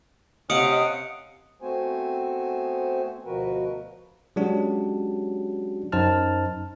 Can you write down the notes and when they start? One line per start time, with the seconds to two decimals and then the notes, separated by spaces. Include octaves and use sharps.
0.50 C3 C#4 D#5 F5 F#5 D#6 C#7 D7
1.62 A3 B3 C4 F#4 C5 G#5
3.25 D2 B2 F3 F#4 A#4 B4
4.36 F#3 G#3 C#4 D4 F#4 G4
5.92 F#2 D#4 C5 A5 F6